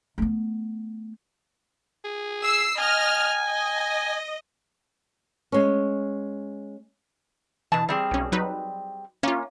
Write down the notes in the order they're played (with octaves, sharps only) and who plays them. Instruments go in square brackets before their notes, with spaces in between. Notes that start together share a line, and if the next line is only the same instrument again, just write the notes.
[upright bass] A3 B3
[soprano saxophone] G#4
[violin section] E6 C7
[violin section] D#5 F6 [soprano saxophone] G#5
[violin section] D#5
[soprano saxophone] G#5
[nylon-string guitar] G#3 C#4
[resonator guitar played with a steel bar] B2 A5 [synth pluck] E3
[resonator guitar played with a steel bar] G3 C4 G#4
[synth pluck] B1 C#4
F#3 D#4 B4
[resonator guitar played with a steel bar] A#3 [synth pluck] C#4 F4